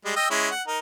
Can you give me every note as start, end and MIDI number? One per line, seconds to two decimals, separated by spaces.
0.05 0.16 55
0.05 0.16 56
0.16 0.26 75
0.16 0.26 79
0.16 0.26 88
0.30 0.49 56
0.30 0.49 61
0.30 0.49 64
0.51 0.63 78
0.68 0.79 63
0.68 0.79 70